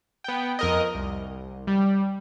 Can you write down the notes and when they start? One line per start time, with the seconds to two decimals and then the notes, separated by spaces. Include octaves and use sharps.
0.24 B3 G5
0.59 F2 A#4 D#5
0.95 C2
1.67 G3